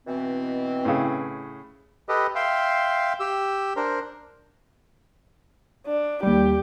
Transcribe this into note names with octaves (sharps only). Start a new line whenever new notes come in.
B2 E3 C4
A2 C#3
G4 A4 B4 D#5
E5 F5 G5 C6
G4 E6
D4 A#4 C5
D4
D#2 G3 G4